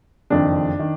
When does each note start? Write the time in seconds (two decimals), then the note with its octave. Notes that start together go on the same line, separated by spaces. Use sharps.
0.30 F#1 F2 D#3 D4
0.79 D#3